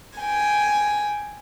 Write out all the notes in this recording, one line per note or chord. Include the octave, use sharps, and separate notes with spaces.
G5 G#5